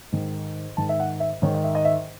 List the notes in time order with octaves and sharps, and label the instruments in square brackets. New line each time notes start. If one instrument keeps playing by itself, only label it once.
[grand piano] G#2 D#3
G#2 D#3 A5
E5
F#5
E5
G#2 D#3 C#5
D#5
E5
D#5
E5